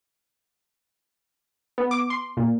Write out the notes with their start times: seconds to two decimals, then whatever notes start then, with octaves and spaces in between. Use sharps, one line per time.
1.78 B3
1.91 D6
2.10 C6
2.37 A#2